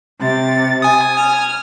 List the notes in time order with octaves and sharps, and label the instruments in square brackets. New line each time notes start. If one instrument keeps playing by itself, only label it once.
[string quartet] C3 A6
[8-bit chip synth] G#5 D#6
[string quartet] F6